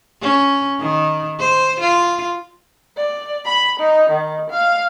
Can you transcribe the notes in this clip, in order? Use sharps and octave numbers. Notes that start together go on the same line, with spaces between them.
C#4
D#3
C5
F4
D5
B5
D#4
D#3
F5